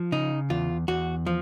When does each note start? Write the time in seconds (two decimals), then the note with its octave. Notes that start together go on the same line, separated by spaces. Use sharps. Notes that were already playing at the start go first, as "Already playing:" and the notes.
Already playing: F3
0.12 C#3 D#4
0.50 E2 F4
0.88 E2 F#4
1.27 F3